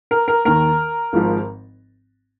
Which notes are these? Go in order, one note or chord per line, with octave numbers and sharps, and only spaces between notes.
A#4
A#4
D#2 D#3 A#4
G#1 G#2 F3